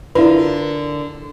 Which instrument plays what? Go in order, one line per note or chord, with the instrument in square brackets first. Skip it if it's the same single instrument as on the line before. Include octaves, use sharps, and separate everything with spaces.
[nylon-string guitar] D3 F4 A#4 [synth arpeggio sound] E4 B4